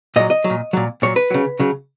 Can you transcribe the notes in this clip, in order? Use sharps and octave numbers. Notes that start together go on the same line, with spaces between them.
A#2 F#3 D#5
D#5
F#3
A#2
A#2 F#3
A#2 F#3 C#5
B4
C#3 F#3
C#3 F#3